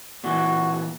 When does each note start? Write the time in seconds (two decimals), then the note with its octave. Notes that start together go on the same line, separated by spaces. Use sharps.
0.24 A#2 E3 F#4